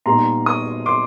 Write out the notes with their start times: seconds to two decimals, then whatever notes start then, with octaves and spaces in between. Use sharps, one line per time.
0.06 A#2 G3 B3 D#4 A#5 C6
0.46 C#6 D#6
0.86 C6 D6